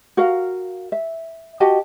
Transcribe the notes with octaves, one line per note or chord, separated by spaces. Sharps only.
F#4 A#4 F5
E5
F#4 G4 D#5 A5